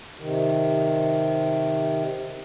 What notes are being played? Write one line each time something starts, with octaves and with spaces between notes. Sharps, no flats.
C3 D#3